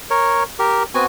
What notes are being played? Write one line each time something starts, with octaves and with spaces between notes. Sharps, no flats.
A#4 C#5
G4 A#4
B3 C4 F#4 G#5